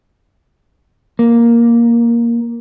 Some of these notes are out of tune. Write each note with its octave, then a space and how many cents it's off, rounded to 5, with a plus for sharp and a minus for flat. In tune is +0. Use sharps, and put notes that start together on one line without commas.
A#3 +5